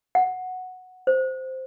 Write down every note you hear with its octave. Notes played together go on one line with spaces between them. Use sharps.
F#5
C5